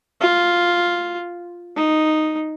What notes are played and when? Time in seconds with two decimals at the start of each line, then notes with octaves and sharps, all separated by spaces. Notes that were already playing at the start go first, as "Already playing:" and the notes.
0.21 F4
1.76 D#4